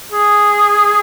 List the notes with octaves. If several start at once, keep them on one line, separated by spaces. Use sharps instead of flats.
G#4